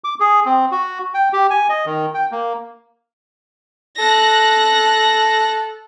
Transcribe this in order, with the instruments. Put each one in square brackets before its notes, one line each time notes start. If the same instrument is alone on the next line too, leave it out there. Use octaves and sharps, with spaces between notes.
[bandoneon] D6
G#4
C4
F#4
G5
G4
G#5
D#5
D#3
G5
A#3
[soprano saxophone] A4 [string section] F#6 A#6